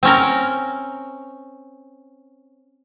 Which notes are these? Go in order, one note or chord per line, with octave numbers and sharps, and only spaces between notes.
C4 C#4 A#4